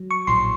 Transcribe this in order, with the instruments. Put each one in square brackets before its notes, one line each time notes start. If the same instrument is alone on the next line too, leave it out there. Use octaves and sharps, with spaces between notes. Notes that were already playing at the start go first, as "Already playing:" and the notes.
Already playing: [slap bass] F#3
[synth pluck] C#6
[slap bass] A#1 A2 F#3 [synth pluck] C6